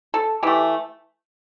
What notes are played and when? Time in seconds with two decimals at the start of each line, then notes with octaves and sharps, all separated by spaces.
0.14 A4
0.43 E3 A3 G4